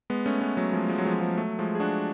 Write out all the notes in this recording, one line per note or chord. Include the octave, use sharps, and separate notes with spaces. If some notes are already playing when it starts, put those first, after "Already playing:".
G#3 B3
A3 C#4
G#3 B3
F#3 A3
F3 G#3
F3 G#3
F#3
F3 G#3
F#3
F3 G#3
F#3 A3
F3 G#3
G#4
D4 F#4